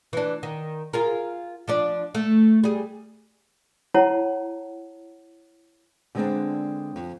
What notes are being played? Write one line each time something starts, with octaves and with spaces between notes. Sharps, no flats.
E3 D4
D#3
F4 G#4 A#4
F3 D4 D5
A3
G3 G#4
E4 C#5 F#5 A5 A#5
D3 G3 G#3 B3 C4 D4
F2